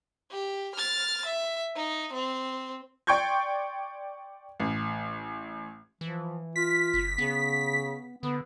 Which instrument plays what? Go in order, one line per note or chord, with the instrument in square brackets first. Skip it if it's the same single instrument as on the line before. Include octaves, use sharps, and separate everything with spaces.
[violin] G4
F6 A6
E5
D#4
C4
[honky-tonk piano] D5 G5 C6 C#6 G6 G#6
A1
[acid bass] E3 [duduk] F3
[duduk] F4 [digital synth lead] B6
[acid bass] F#1
[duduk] C#3 [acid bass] B3
[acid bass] D3 [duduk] B3